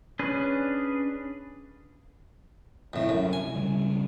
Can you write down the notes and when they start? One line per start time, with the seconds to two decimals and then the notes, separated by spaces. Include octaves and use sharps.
0.19 C#4 D4 G#4 B4
2.93 D1 G1 F2 A2 C3
3.09 F#2
3.33 G#5
3.54 D1 C#3 G3